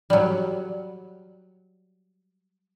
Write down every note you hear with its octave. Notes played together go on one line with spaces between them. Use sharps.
F#3 G3